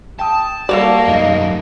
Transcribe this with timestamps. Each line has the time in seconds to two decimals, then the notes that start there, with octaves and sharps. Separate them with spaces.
0.19 G5 A5 D#6
0.69 G3 A#3 F#4 A4 C#5 D5
1.08 F#2 D#4 D#5